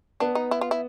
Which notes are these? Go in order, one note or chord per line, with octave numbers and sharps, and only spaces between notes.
B3 D4
D#4
E4
F4
E4